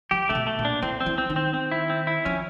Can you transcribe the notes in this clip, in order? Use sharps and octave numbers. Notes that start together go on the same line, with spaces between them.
F3 G4
C3 A3
B2
A3
A#2
D4
E3 C4
C4
E3
C4
D#3
C4
C4
E4
C4
E4
F3 C#4